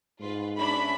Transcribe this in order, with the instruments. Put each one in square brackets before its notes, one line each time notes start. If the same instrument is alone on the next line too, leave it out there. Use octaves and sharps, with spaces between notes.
[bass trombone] G#2 [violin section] F4 B4
[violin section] C#4 D4 E5 [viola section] B5